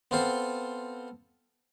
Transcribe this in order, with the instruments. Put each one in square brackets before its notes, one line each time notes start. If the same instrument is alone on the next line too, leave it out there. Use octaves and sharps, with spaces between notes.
[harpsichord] B3 C4 F4 A4 C5